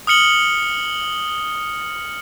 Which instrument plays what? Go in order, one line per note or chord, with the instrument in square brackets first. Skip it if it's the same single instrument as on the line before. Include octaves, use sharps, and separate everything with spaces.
[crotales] D#6 F6 C#7 F#7 G7